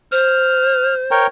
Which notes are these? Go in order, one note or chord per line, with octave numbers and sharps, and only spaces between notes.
C5 F6
A#4 C#5 G5